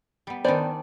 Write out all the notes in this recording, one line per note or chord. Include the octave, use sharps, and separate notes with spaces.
G3 B3
D#3 B3 C#4 D4 C5 D5